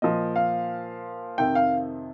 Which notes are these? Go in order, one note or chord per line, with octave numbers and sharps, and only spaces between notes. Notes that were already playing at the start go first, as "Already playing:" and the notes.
A#2 F3 D#5
F5
F2 C3 D#3 G5
F5